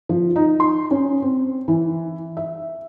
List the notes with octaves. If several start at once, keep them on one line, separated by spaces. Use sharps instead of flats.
F3
D#4
C6
C#4
C4
E3
E5